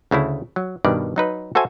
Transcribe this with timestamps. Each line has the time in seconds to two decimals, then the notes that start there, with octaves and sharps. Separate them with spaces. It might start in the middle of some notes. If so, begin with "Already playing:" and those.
0.11 D2 C#3 A3 E4
0.56 F#3
0.85 G2 B2 D#3 D5
1.16 F#3 D#4 B4
1.55 F#4 A4 C5 E5 G#5